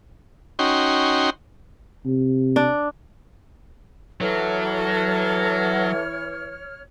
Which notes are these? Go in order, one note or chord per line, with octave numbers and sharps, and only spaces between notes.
C#4 D#4 F#4 G5 C6
C3
D4
E3 F#3 A4 C#5 F6